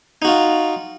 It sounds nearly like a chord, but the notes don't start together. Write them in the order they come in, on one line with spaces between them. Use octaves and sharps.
D#4 F#4 F4